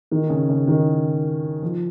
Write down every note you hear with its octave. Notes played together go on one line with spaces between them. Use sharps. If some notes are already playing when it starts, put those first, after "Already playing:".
D#3
C#3
C#3
D#3
F3